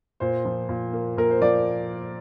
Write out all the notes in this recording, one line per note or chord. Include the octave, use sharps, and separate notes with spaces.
A#2 C5
F3
A#2
A#3
A#2 A#4
C5
F3 D5